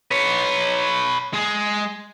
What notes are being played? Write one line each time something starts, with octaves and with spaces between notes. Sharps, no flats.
B4 C#5
G#3 G#4